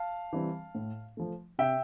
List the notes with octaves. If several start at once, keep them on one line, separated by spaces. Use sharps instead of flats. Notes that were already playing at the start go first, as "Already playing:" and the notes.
Already playing: F5 A5
E3 G3 C4
A2
F3 A3
C3 E5 G5